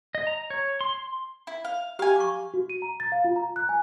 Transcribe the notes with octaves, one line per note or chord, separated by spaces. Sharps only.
D#5
A#5
C#5
C6
E4
F5
G4 F5 G#5
C#6 D6
F#4
D#7
A#5
A6
F5
F4
A#5
F#6
G#5